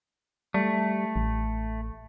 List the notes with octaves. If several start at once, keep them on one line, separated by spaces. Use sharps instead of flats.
G3 A3
A1